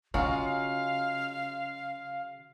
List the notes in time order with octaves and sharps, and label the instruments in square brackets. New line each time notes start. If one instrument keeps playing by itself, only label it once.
[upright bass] C#3 [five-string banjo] F#3 G#3 F4 [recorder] F5